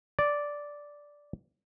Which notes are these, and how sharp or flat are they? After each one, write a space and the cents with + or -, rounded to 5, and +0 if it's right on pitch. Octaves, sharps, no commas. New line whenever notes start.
D5 -5